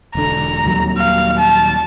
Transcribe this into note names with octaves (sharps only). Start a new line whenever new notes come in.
E1 D3 A#5
D#1 D#2 F#3
F5
A5